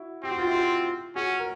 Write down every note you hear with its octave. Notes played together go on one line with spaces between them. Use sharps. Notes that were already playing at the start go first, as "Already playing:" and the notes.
Already playing: E4 F#4
C4 G4
F#4
F4
E4 F#4
F4 G4
C#4 F#4 G#4
A#4